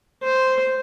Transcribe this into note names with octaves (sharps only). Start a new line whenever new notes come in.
C5